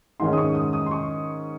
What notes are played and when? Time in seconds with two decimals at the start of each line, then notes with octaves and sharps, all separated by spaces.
0.20 G#2 D#3 G#3 C#4 C6
0.33 D#6
0.38 C#6
0.55 D#6
0.73 D#6
0.86 C6
0.91 C#6